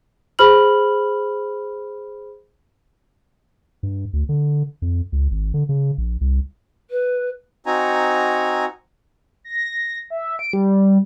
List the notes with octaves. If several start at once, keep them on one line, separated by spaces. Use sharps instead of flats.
G#4 C5 B5 F6 F#7
G2
D2
D3
F2
C#2
G#1
D3
C#3
A#1
C2
B4
C4 D#4 F#4 G#5 A#5
A#6
E5
D7
G3